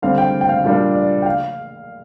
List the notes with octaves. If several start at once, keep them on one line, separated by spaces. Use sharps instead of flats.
D3 G3 C4 F5
G5
G5
F5
A#2 G3 D4 F5
D5
G5
F5